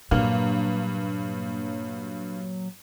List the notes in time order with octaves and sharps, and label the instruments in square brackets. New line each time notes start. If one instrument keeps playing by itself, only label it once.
[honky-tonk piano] G2 [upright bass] A#2 [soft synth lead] F#3 [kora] A#3